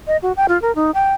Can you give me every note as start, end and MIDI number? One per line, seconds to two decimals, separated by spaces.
0.07 0.17 75
0.22 0.32 66
0.37 0.46 79
0.48 0.60 65
0.62 0.74 70
0.75 0.91 63
0.94 1.14 79